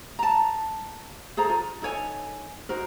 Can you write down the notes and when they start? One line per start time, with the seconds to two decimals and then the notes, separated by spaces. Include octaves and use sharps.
0.19 A5 A#5
1.37 G#4 A4 C5 A#5
1.50 F4
1.82 D#4 A4 C#5 G#5
2.69 D#4 F#4 A#4 C5